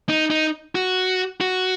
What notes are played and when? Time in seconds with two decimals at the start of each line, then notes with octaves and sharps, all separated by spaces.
0.09 D#4
0.30 D#4
0.75 F#4
1.41 F#4